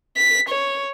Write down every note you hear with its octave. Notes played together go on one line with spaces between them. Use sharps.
B6
C#5